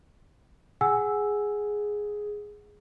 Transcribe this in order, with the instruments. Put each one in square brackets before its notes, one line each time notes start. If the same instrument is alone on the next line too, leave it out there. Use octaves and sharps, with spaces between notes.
[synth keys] G#4 [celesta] F#5 G#5 E6